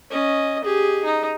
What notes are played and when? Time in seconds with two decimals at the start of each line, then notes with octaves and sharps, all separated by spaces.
0.10 C#4 D#5
0.64 G4 G#4
1.05 D#4